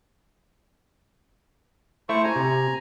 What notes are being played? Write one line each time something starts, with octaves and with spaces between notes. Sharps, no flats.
A3 E4 C5 C#6
G#5 A#5
C3